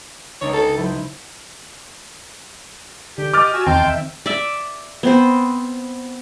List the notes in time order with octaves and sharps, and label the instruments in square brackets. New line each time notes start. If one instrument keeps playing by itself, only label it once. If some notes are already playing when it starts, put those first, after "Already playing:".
[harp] C#2 D4 D#4 [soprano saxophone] C#5
[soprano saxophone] A4
[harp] F#3 C5 [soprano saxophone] E4
[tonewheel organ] D3 [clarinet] G4
[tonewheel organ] D#5 [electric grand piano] D6 F6 A6
[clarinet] F#4 [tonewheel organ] G#5 E6
[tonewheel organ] E2 A5 C6 [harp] D#3 [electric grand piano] C4 [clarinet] G5
[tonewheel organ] E5
[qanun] D5 E5
B3 C4 C5